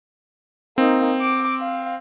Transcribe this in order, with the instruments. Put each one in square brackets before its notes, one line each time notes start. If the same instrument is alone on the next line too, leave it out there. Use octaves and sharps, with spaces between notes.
[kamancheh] A#3 D#4 [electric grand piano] C4
[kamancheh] D6
F5